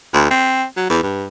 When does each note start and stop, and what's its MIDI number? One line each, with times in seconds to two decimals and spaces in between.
0.14 0.26 38
0.31 0.65 60
0.77 0.86 54
0.90 0.99 40
1.03 1.26 43